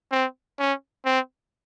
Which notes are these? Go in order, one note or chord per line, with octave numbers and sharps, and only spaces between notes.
C4
C#4
C4